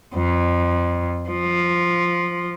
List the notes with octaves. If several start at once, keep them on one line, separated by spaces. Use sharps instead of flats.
F2
F3